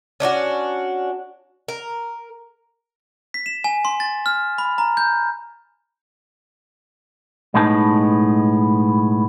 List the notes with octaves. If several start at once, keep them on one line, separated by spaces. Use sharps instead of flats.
C#4 D4 F4 F#4
A#4
B6
E7
G#5
C6
A6
F6
B5
A#5
G6
B1 A2 G#3 B3 D#4 A5